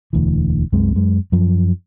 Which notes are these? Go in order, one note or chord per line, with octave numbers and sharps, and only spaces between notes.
E1 D2 E3
C2 F#2 C3 G#3
F#2 G#3
F#2 F3